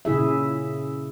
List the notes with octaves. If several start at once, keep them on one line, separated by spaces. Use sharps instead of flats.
A#2 C#3 E4 G#4 E5